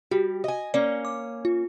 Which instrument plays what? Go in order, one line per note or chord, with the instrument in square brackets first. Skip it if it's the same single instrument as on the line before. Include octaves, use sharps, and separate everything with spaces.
[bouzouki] G3 [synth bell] F#4
[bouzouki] D#5 G#5
[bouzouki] A#3 C#4 [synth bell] D5
[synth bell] D6
F4